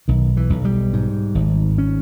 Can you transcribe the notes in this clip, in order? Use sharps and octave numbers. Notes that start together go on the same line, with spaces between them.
B1 D#3
E3
B1
G3
G#2
G#1
C#4